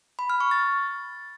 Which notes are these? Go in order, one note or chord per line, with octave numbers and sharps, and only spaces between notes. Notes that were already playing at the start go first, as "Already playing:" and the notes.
B5
F6
C#6
A6